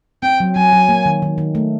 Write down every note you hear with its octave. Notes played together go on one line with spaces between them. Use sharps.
C4 G5
F#3
F#3 G#5
F#3
A#3
D#3
D#3
D#3
A3